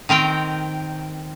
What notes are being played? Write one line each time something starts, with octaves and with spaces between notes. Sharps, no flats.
D#3 C4 A#4 G5